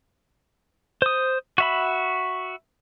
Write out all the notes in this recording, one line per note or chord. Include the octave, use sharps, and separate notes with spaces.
C5 D#6
F#4 E5 B5